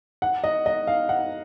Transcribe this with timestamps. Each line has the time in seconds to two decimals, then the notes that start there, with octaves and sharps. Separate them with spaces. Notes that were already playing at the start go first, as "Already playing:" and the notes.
0.22 F#5
0.44 D#5
0.66 D#5
0.87 F5
1.09 F#5